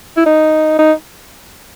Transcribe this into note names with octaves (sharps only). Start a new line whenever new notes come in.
E4
D#4
D#4